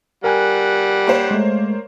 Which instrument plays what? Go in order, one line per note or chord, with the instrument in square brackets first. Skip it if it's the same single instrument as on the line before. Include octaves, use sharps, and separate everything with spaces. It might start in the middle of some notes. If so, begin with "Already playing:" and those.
[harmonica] G3 F#5 [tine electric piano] A#4 G#5 F#6
[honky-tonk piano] A#3 C5 C#5
[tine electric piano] G#3 A3